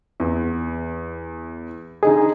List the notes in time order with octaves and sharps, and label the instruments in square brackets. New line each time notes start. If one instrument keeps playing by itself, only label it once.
[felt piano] E2
[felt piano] D3 D#4 D#5 [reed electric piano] G#4